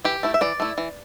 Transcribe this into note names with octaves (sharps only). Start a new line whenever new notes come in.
E3 G4
A3 E4
E5
E3 D5
A3 E4
E3